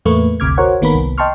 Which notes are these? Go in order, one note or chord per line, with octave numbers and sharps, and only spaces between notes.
E2 A2 A3 A#3 B4 C#6
G#1 D2 C3 D6 F6 G#6
F#4 A#4 C5 C#5 F#5
G1 D#3 A#3 B3 A#4 B5
C2
D#5 G5 A5 C6 C#6 F6